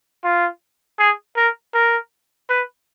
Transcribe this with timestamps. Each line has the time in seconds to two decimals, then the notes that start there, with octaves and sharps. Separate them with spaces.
0.24 F4
0.99 G#4
1.37 A#4
1.74 A#4
2.50 B4